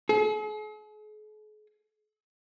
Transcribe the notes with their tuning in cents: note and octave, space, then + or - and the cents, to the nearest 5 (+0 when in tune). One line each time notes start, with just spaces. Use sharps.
G#4 +45